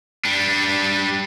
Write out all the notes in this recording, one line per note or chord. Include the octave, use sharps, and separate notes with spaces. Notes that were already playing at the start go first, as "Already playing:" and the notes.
G3 D4